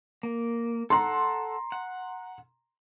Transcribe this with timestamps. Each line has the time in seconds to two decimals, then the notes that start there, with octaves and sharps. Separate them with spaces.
0.23 A#3
0.90 A4 F#5 A#5 C6
1.72 F#5